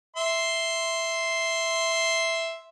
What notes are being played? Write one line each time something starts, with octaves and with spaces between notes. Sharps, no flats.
E5 C6